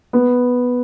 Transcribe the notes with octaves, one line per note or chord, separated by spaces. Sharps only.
B3